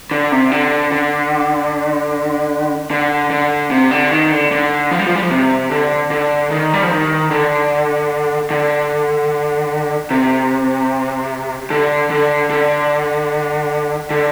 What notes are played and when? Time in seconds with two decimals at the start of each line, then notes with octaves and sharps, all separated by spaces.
0.11 D3
0.32 C3
0.52 D3
0.92 D3
2.91 D3
3.31 D3
3.71 C3
3.91 D3
4.11 D#3
4.31 D3
4.52 D3
4.91 F3
4.99 G3
5.07 F3
5.15 G3
5.22 F3
5.30 C3
5.71 D3
6.11 D3
6.51 D#3
6.74 G3
6.83 F3
6.91 D#3
7.31 D3
8.51 D3
10.11 C3
11.70 D3
12.10 D3
12.50 D3
14.10 D3